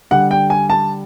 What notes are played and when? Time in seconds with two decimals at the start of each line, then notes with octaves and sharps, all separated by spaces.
0.11 D3 G3 F#5
0.31 G5
0.50 G#5
0.70 A5